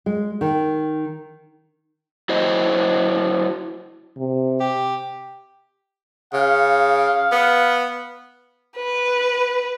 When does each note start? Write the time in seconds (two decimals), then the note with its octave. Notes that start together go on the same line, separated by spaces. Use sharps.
0.06 G#3
0.41 D#3
2.29 F#3 E4 C5 D#5
4.17 C3
4.60 G4
6.33 C#3 F5
7.32 B3
8.76 B4